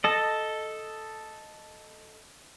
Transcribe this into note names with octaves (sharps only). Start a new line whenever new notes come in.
A4 D#5